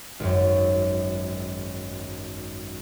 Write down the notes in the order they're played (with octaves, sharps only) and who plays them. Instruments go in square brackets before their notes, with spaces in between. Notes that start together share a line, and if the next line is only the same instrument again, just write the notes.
[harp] G#1 F#2